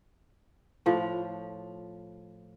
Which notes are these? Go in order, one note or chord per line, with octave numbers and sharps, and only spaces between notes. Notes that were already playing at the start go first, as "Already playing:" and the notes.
A2 F3